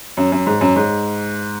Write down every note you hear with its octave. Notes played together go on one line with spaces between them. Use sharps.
F#2
F#2
G#2
F#2
G#2